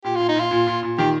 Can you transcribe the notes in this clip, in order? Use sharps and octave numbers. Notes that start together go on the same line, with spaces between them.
A#2 G4
F4
A#2
D#4
A#2 F4
A#2
A#2
A#2
D#3 G4